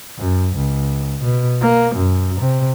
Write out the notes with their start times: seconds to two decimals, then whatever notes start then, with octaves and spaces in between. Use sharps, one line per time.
0.19 F#2
0.55 C#2
1.21 B2
1.61 A#3
1.95 F#2
2.40 C3